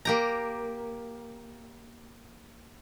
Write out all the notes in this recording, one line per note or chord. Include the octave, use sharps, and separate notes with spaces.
A#3 G4 A#5